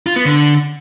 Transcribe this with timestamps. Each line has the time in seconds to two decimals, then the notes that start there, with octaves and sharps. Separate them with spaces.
0.07 F4
0.16 B3
0.25 D3